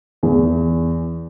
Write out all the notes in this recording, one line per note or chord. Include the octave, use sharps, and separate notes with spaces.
E2